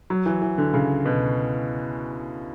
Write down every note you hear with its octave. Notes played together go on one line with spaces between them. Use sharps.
F#3
E3
E3
D3
C#3
B2